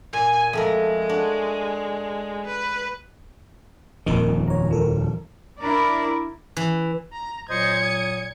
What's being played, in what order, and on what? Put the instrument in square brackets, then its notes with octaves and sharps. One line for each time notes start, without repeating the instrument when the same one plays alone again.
[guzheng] A#2 [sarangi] G#5
[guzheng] F2 A3 A#4 [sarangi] G#3
[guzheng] D4 F#4
[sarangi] B4
[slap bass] D#1 F2 D#3 [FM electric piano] A#2 A#4 D#5
[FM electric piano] C#5 A#5
F3 A4 A#4
[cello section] D4 E4 A#4 D5
[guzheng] E3
[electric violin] A#5
[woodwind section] A#2 F#3 [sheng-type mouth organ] C5 D#5 [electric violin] G#6 C#7
[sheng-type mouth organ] D#6